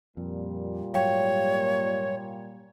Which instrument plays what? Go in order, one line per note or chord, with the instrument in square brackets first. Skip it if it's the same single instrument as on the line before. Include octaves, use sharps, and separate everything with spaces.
[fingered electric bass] F2 [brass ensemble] A#2 G3
[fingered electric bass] G#2 F#3 [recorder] C#5 [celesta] F5 G5